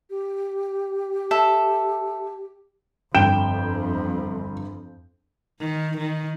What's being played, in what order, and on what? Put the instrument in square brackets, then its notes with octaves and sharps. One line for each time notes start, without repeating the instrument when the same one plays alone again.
[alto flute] G4
[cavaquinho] A4 E5
[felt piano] G1 G6 E7 [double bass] F2 [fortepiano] G5
[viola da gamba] D#3
D#3